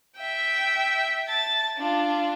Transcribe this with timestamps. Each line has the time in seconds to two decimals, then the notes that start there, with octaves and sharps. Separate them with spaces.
0.17 E5 G5
1.28 A5 A6
1.77 D4 F4